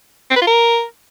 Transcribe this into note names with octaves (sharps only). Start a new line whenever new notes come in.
C4
B4
F4
A#4